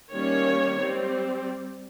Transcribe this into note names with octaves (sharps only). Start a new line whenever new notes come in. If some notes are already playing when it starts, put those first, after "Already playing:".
D#3 G3 A#3 C#4 C#5
G3 C4